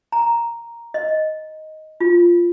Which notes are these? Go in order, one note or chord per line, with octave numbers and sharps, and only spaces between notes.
A#5
D#5
F4